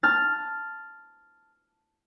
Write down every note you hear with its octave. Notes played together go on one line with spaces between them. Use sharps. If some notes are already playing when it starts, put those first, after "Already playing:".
A5 F6 A6